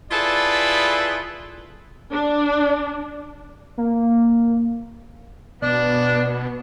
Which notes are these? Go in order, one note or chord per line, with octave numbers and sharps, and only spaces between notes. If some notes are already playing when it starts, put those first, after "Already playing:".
E4 F4 G#4 A4 B4 D5
D4
A#3
B2 B3 D4 D5